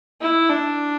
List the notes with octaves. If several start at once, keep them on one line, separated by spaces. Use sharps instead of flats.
E4
D4